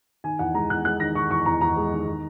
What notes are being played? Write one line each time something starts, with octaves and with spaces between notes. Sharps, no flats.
D#3 G#5
E2 F#5
G#3 A#5
E2 F#6
G#3 F#6
D#3 A#6
D#3 C#6
E2 C#6
E2 A#5
E2 A#5
G#3
D#3
D#3